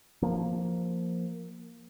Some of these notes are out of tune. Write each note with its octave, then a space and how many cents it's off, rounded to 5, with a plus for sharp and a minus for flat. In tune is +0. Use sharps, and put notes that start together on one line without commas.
F3 +0 A#3 +0